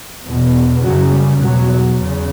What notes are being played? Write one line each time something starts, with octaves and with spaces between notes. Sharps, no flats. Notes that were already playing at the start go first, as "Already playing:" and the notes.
E2 B2
F#2 C#3 F#3
G3
E2 B2 F#3
E2 C#3